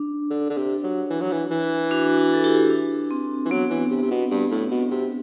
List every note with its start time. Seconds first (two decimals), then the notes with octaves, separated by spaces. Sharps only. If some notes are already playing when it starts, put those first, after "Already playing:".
Already playing: D4
0.30 D3
0.50 D3
0.57 C3
0.84 F#3
1.10 E3
1.21 F#3
1.32 E3
1.51 E3
1.91 D4 F#4
2.17 D4 F#4
2.34 A4
2.44 E4 G4
2.70 D4
3.11 C4
3.45 E3
3.51 F#3 B3
3.71 E3
3.91 C3
4.03 C3
4.11 B2
4.31 G2
4.51 A2
4.71 B2
4.91 C3